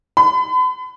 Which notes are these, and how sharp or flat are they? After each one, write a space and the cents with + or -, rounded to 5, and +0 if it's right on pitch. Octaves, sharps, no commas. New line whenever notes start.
B5 +40